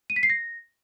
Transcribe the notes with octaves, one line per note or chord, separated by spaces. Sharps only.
D#7
B6
C7
A#6